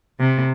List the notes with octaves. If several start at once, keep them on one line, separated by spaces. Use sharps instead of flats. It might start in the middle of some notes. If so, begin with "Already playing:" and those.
C3